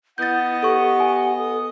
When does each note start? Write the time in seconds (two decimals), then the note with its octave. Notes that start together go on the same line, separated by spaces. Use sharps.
0.18 B3 E4 D#5 F#5 G6 A6
0.63 G4 A4 C#6
1.00 G#5
1.38 A4 D#6